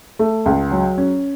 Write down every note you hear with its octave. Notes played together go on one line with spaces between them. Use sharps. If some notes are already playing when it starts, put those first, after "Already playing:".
A3
C#2
F#3
C#4